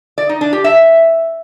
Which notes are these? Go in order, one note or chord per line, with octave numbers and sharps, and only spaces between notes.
D5
D#4
D4
G4
E5